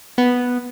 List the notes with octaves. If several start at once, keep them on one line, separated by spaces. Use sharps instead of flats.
B3